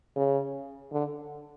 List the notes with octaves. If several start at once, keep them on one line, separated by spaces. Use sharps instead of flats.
C#3
D3